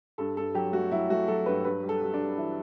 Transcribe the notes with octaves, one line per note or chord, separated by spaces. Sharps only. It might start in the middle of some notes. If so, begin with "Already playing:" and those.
G2 A4
G2 A4
F#3 G4
A3 F#4
F#3 E4
A3 F#4
F#3 A4
G2 B4
G2 B4
G3
A4
G3
D4
G3
E3 E4